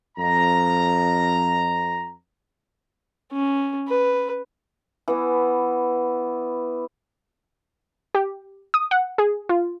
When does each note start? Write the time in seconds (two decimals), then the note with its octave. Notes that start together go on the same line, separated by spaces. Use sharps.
0.18 F2 A#5
3.33 C#4
3.88 B4
5.08 E3 B3
8.15 G4
8.74 D#6
8.91 F#5
9.18 G#4
9.49 F4